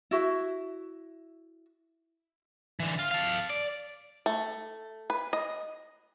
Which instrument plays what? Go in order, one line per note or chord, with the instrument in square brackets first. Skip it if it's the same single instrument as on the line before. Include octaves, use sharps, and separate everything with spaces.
[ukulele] E4 F#4 E5
[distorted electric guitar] D3 E3
F4
A4 F5
D5
[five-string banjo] A3
B4
D#5